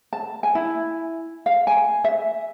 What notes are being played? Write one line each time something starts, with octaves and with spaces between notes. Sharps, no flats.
A5
G#5
E4
F5
G#5
E5